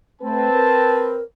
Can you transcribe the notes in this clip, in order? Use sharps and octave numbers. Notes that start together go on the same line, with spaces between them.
A3 C4 B4 A5
A#4